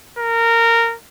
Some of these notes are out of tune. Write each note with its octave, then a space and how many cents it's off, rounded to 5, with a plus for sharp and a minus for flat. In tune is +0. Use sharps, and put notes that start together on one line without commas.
A#4 -15